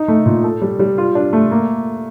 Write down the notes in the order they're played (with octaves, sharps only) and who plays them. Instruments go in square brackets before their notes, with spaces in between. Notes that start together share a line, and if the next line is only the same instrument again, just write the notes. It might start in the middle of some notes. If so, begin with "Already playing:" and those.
Already playing: [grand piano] D#4
A3
A#2
A4
G3
G3
F4
D4
A3
A#3